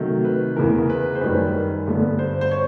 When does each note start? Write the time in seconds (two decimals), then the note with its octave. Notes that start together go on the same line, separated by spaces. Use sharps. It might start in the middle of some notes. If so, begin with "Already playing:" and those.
Already playing: C3 D#3 F#3 A3
0.24 B4
0.56 E2 C#3 E3 A#4
0.90 B4
1.15 C5
1.21 F#2 D#3 G3 B4
1.87 G2 D3 G3 B3
2.19 C5
2.41 C5
2.51 C#5